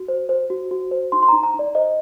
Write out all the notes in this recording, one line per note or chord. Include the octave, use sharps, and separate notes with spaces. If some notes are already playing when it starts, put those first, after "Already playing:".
Already playing: F#4
C5
C5
F#4
F#4
C5
D#4 C6
C6
A#5
D#4
A#5
D#4 D5
C5 D#5